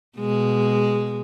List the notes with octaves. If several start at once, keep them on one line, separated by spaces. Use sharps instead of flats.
B2 G#3